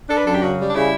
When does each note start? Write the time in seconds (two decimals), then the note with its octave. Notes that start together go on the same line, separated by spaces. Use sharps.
0.09 D4 A4
0.17 B4
0.27 F#2 A4
0.34 G4
0.43 C#3 F#4
0.59 G3
0.69 D4
0.75 C#3 E4